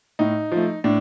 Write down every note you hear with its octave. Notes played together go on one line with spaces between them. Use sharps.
A2 D#4
F3 A3
A2 D4